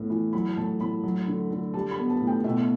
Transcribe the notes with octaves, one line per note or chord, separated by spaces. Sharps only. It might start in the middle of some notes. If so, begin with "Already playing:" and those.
Already playing: A2 B3
E3
F#3 B5
A2 A5
A2 B5
F#3
D3
D3
G3 A5
B5
B3
A5
A2
G5
B2 E5